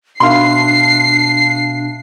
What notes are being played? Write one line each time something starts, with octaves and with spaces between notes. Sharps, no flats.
B2 D4 E5 F5 C6 C7